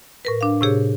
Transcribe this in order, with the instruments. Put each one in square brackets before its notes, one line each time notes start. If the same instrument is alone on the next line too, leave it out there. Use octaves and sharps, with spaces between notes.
[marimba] A2 A#4 B4
D4 F5
A2 C3 G4 G#4 C#5